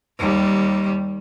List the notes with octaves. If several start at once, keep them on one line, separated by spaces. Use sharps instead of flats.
D#2 G3